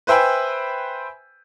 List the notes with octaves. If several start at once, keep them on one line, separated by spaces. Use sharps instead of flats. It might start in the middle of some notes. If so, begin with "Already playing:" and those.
B4 C5 E5 G5 G#5 B5